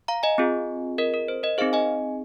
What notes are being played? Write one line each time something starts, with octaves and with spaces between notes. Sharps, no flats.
F5 A#5
D#5 G#5
C4 F4 G#4
A#4 D#5
A#4
C5
A#4 D#5
C4 D#4 G#4 C5 F5
D#5 G#5